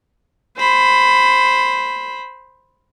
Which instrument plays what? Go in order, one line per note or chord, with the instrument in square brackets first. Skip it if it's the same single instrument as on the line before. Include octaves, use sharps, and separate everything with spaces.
[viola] C5 B5